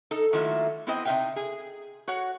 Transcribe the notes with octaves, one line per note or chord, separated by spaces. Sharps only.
D#4 A4
D#3 F#3 A3 A#3 E4 F4
B3 C4 E4 C5 D#5 G5
C3 D#4 C5 E5 F5 G5
G#4
F#4 C#5 F#5